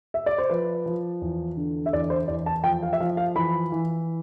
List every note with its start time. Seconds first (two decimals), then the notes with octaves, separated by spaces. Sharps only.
0.14 E5
0.26 D5
0.38 C5
0.50 F3 B4
0.86 F3
1.21 E2
1.57 D3
1.86 E5
1.93 E2 D5
2.10 C5
2.28 E2 D5
2.46 A5
2.64 F3 G5
2.83 F5
2.93 E5
3.00 F3 F5
3.17 F5
3.35 E3 B5
3.72 E3